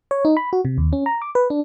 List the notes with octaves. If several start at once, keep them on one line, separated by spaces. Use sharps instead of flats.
C#5
D#4
B5
F#4
C3
D#2
C#4
A#5
D6
B4
D4